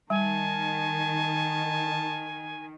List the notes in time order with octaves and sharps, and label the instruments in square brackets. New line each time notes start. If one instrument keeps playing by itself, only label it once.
[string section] D#3 [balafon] G3 [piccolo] G#5 [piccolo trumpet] A5